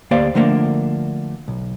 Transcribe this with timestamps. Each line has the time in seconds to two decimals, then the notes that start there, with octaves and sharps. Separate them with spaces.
0.11 D2 A#3 G4 C5 D5 F5
0.35 D3 F3 A3 A#3 C4 D4
1.48 B1